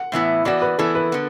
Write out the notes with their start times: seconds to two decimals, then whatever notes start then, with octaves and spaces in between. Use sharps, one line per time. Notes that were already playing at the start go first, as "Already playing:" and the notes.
Already playing: F#5
0.12 A2 E3 B3 E4
0.45 E3 B3 F#4 D5
0.62 B4
0.78 E3 B3 E4 A4
0.95 B4
1.12 D3 B3